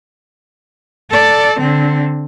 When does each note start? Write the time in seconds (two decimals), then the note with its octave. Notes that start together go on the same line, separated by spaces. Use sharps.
1.10 A4 D5
1.59 D3 C4